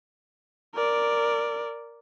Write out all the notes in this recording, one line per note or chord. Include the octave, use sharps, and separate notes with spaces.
A#4 D5